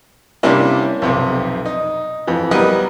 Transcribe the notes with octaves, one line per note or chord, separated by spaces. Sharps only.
C3 G3 A#3 C#4 D4 E4
B1 F2 C3
D#4
F2 E3
F#3 G3 B3 A#4 B4 D#5